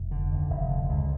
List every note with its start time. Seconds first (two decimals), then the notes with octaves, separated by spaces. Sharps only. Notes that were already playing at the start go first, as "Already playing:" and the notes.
Already playing: F1
0.11 D3
0.32 D#2
0.50 F1
0.69 D3
0.89 C#2